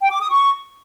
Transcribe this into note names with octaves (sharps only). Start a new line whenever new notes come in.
G5
D6
D#6
C#6